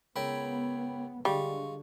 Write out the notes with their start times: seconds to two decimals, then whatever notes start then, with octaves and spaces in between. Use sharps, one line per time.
0.16 C#2 B3 A#4 C#5 E5 G5 B5
1.25 D3 G3 G#3 F4 C#6